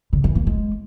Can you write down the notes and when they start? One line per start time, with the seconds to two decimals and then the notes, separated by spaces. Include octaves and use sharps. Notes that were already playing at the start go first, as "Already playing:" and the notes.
0.13 D3
0.24 E3
0.35 A#3
0.47 G#3